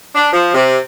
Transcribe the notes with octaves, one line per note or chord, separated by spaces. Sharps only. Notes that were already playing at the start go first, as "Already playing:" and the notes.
D4
F3
C3